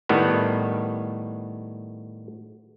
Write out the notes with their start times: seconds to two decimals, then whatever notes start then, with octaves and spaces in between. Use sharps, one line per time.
0.09 A2 D#3 G3 B3